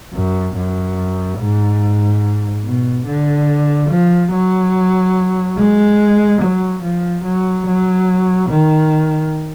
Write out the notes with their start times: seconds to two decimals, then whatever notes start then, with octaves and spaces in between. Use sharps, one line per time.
0.14 F#2
0.57 F#2
1.39 G#2
2.65 B2
3.06 D3
3.90 F3
4.32 F#3
5.58 G#3
6.42 F#3
6.83 F3
7.24 F#3
7.67 F#3
8.50 D#3